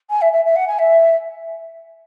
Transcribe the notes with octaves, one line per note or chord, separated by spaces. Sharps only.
G#5
E5
E5
E5
F#5
G#5
E5